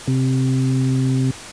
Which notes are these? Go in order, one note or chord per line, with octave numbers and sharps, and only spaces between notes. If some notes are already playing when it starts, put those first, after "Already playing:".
C3